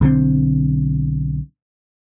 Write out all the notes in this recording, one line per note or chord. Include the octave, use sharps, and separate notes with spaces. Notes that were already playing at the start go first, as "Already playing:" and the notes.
B1 D3 F3 C4